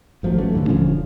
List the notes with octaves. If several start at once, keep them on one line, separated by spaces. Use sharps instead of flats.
G#1 F3 F#3 A3
E3 F#3 A3 C#4
D#2 A2 D3
E1 D3 F3 C#4